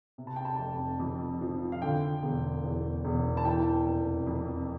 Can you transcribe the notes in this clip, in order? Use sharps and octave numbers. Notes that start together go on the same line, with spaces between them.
C3
A5
G5
A5
F1
F2
F3
F5
D3 G5
E1
E2
E1
A5
E3 G5
F1
F2